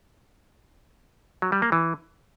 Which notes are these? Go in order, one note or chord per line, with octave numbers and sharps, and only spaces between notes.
F#3
G3
A#3
E3